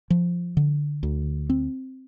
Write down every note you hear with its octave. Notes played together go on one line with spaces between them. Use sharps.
F3
D3
D2
C4